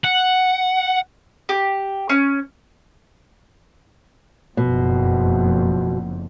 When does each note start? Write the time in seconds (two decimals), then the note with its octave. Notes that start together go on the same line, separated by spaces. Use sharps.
0.05 F#5
1.49 G4
2.09 C#4
4.57 F#1 F2 B2